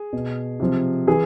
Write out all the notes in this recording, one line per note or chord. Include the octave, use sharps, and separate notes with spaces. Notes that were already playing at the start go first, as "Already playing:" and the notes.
Already playing: G#4
B2
C3 F3
E3 G#4